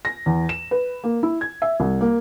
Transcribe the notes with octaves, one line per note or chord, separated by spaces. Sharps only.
A#6
E2
E7
B4
A#3
E4
G#6
E5
C2
A#3